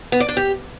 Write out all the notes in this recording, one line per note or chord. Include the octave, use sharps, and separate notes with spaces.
B3
D5
D4
G4